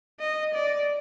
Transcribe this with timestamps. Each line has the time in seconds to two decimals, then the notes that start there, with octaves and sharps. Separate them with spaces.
0.20 D#5
0.54 D5